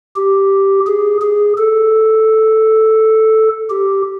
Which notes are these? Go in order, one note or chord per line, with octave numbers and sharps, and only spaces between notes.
G4
G#4
G#4
A4
G4